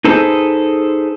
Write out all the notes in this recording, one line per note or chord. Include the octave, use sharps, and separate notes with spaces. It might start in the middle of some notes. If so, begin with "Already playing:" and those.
D#4 G#4 A4 B4 C5